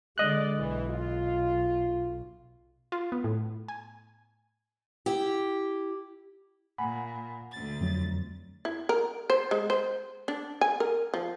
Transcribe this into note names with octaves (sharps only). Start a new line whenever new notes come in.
D3 G#3 D5 D#5 F#6
B1 E3
F4
F4
B3
A2
G#5
E4 G4
A#2 F#5 G#5 B5
D2 A6
F2 F#3
E4
A#4
C5
G#3
C5
D4
G#5
A#4
F3